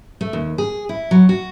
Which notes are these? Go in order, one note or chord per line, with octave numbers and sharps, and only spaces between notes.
A3
D#2
G#4
E4
F#3
F#4